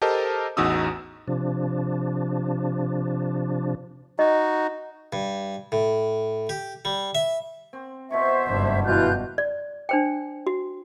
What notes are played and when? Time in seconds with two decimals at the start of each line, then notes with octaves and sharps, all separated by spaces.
0.02 G4 A4 A#4 C5 D#5 A5
0.57 A1 E2 D#4 F#4 D#6 E6
1.28 C3 F3 D4
4.19 D#4 F#4 D#5
5.13 G2
5.72 A2
6.49 G4
6.85 G3
7.15 E5
7.73 C4
8.10 B2 E4 C5 E5 C#6
8.48 F#1 G2 F#4
8.84 B2 E3 F4 F#6 G6
9.38 D5
9.89 D4 C5 G5
10.47 F#4